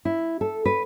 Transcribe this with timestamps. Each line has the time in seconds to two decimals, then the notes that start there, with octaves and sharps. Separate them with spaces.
0.05 E4
0.41 A4
0.66 B4